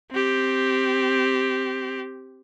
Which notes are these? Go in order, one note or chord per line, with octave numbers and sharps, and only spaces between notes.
C4 G4